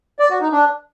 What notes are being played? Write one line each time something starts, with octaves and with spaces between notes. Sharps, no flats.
D5
F#4
D#4
D4